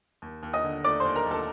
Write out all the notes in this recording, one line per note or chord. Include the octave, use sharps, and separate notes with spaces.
D#2
D#2
D#5 D#6
D3
A3 D5 D6
D#2 C5 C6
A#4 A#5
D#2
A4 A5